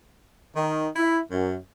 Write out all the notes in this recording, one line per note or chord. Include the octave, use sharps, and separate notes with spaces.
D#3
E4
F#2